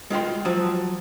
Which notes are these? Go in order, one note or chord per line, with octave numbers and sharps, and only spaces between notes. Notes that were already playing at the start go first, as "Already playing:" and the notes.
G#3 F4 G5 C6
F3 F#3 C5